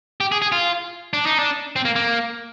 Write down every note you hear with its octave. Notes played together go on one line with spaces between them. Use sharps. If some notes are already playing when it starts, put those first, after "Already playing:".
G4
G#4
G#4
F4
D4
D#4
D4
C4
A#3
A#3